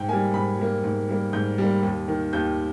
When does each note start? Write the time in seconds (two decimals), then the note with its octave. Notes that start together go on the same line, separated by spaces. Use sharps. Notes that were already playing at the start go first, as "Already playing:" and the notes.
Already playing: G#2 G5
0.08 G3 A#3 G#5
0.34 G#2 B5
0.59 G3 A#3
0.84 G#2
1.09 G3 A#3
1.33 G#2 G6
1.58 G3 A#3
1.83 D#2
2.08 D#3 A#3
2.33 D#2 G6